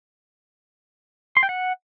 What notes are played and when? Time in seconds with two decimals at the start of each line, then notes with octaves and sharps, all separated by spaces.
1.37 C6
1.43 G5
1.49 F#5